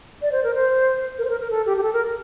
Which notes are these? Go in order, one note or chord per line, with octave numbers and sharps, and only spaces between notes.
D5
C5
A#4
C5
A#4
C5
A#4
A#4
A4
G4
G4
A4
A#4